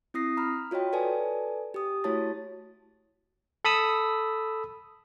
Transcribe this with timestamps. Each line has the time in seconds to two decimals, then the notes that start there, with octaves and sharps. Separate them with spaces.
0.14 C4 E4 D#6 A#6 C7
0.37 A#5 B5 F6
0.71 F4 F#4 C#5 D#5 G5
0.93 A4 B4 D5 G#5 A5
1.74 G4 D#6
2.04 A3 E4 F#4 C#5 A5 A6
3.65 A4 B5 D#6 E6